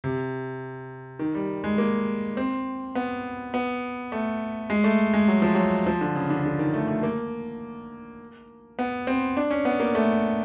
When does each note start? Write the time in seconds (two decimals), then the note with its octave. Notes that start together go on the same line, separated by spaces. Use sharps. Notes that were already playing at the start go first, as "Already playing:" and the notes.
0.04 C3
1.19 D#3
1.34 G3
1.64 G#3
1.78 A#3
2.37 C4
2.95 B3
3.54 B3
4.12 A3
4.70 G#3
4.84 A3
5.14 G#3
5.28 F#3
5.42 F3
5.55 F#3
5.87 F3
6.01 D3
6.15 C#3
6.30 D3
6.45 D3
6.59 D#3
6.74 A3
6.88 A3
7.03 A#3
8.79 B3
9.07 C4
9.37 D4
9.51 C#4
9.65 B3
9.80 A#3
9.95 A3